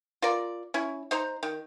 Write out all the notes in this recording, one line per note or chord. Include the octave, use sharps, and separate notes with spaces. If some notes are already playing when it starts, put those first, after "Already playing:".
F4 A#4 D5
C#4 E4
D#4 C5 A#5
D#3